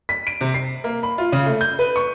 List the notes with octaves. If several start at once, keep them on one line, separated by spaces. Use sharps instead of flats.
B6
D7
C3
C7
A#3
B5
F4
C#3
A3
G6
B4
C#6